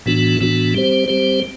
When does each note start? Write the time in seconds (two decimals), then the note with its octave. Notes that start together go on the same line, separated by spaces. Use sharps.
0.06 A2 E3 B3 D4 F#4
0.40 A2 E3 B3 D4 F#4
0.74 G3 C4 G4 C5
1.08 G3 C4 G4 C5